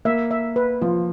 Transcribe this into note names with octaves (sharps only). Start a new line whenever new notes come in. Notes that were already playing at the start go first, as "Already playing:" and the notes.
A#3 E5
E5
B4
F3 F4